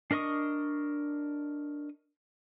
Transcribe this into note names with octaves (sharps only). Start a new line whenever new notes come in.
D4 A#4 D#5 C#6 D#6